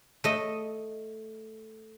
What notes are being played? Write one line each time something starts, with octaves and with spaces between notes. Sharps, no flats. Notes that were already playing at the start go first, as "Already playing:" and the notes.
A3 D#5